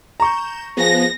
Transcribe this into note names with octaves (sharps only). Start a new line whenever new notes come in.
A#5 C#6 G6 E7
F3 B3 G#4 A#6